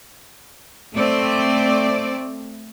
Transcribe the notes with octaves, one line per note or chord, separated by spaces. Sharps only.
A3 C4 D5